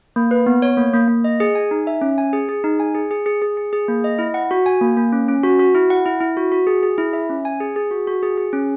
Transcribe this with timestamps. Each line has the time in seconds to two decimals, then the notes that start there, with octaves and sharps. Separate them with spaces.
0.16 A#3
0.31 B4
0.46 B3
0.62 C#5
0.77 A#3
0.94 A#3
1.08 A#3
1.24 D#5
1.40 G#4
1.55 G#5
1.71 D#4
1.87 E5
2.01 C#4
2.18 G#5
2.33 G#4
2.49 G#4
2.64 D#4
2.80 G#5
2.94 G#4
3.11 G#4
3.26 G#4
3.42 G#4
3.57 G#4
3.73 G#4
3.88 A#3
4.04 D#5
4.19 E4
4.34 F#5
4.51 F#4
4.66 G#5
4.81 A#3
4.97 A#3
5.13 C#4
5.28 C#4
5.44 F#4
5.59 F#4
5.75 E4
5.90 F#5
6.06 E4
6.21 E4
6.37 F#4
6.52 F#4
6.67 G#4
6.83 G#4
6.98 E4
7.13 E5
7.29 C#4
7.45 G#5
7.60 G#4
7.76 G#4
7.91 F#4
8.07 F#4
8.23 G#4
8.38 G#4
8.53 C#4